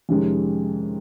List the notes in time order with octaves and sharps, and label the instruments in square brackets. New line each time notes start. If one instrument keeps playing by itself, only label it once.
[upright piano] F2 C3 D#3 G#3 C#4